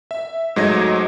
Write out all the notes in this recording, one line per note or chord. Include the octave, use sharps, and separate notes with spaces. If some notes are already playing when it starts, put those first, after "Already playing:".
E5
G#2 F#3 A3 D#5 G#6 A#6